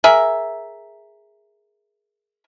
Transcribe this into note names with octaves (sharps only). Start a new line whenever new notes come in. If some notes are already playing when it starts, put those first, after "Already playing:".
G#4 A#4 E5